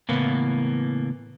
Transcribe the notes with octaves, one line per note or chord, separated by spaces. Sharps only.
A2 C#3 E3 A#3 B3